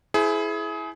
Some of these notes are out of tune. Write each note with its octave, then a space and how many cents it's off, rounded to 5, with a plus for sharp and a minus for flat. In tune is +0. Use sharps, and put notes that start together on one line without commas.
E4 +0 G#4 +25 C5 -35